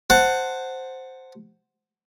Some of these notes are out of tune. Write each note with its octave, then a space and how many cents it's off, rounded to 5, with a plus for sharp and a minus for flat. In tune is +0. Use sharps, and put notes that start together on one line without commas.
C5 +0 F#5 +0 A5 +20